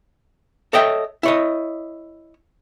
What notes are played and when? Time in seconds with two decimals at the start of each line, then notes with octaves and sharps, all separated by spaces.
0.73 A4 C#5 D#5 E5 G5
1.23 E4 C#5 D#5